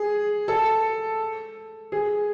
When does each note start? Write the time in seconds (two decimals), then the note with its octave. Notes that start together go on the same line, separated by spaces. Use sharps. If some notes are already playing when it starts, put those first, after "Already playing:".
Already playing: G#4
0.48 A4
1.92 G#4